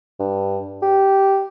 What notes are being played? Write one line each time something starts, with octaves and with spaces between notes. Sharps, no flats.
G2
G4